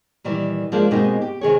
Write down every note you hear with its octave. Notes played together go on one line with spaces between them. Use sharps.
A#2 D#3 E3 G3
F3 G#3 A#3 D4 F4
B2 G#3 A#3 C4 D#4 G4
G4
C3 D#3 G#4 C#5